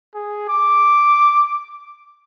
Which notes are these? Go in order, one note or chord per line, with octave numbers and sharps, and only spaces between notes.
G#4
D6